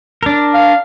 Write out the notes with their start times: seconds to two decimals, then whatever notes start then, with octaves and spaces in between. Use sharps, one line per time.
0.23 D4 A#4
0.54 F5